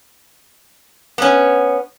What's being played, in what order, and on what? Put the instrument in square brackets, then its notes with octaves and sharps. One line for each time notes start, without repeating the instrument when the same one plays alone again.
[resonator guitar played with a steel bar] B3 C#4